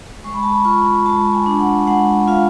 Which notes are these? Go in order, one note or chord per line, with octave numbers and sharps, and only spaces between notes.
G#3 C#6
B5
A5
B5
F4 C#6
G#3 A5
G#5
D4
F#5
G#3 F#5
F4 F5